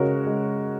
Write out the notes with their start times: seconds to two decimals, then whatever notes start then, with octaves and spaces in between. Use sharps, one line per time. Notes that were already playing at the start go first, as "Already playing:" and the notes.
Already playing: C#3 G#3 F#4 A#4 C#5
0.27 G#3